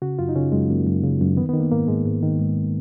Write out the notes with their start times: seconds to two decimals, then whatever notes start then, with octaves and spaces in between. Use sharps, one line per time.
0.02 C#3 F#4
0.19 F#2 F4
0.29 D#4
0.36 C#3 C#4
0.52 F#2 G#3
0.69 F#2 A#3
0.87 F#2
1.03 C#3
1.21 F#2
1.37 D#3 B3
1.49 D#3 B3
1.60 A#3
1.72 G#2 A#3
1.88 G#2 G#3
2.05 G#2
2.23 D#3
2.39 G#2